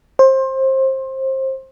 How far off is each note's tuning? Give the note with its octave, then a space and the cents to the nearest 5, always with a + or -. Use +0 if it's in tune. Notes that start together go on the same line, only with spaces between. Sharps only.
C5 +25